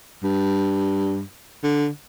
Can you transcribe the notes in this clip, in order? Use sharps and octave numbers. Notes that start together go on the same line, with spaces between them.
G2
D3